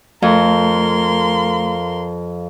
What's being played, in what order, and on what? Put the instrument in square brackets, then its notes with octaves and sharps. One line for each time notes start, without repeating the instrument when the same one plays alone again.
[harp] F2 [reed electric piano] A3 [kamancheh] A#4 C6